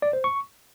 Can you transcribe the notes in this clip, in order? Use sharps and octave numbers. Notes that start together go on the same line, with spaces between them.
D5
C5
C#6